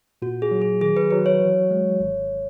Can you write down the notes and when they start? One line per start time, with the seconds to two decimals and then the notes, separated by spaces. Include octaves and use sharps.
0.22 A#2 F#4
0.42 G#4
0.51 F#3
0.62 G#4
0.81 D#3 G#4
0.97 B4
1.10 F#3 B4
1.26 C#5
1.41 E3
1.71 G#3
2.00 G#1